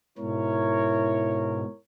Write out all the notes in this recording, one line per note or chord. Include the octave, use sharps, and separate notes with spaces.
G#2 B2 E4 A#4 C#5